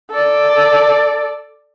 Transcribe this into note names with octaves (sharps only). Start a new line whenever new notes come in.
A4 D5